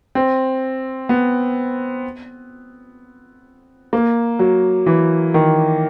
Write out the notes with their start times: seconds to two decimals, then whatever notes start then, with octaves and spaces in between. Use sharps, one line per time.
0.15 C4
1.09 B3
3.93 A#3
4.39 F#3
4.86 E3
5.34 D#3